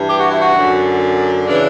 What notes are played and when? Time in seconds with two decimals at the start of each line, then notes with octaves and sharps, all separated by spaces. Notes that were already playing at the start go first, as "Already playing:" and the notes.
Already playing: G2 E3
0.09 G4
0.20 F#4
0.31 E4
0.42 F#4
0.55 F#2 D3
1.47 C#3 E3 D4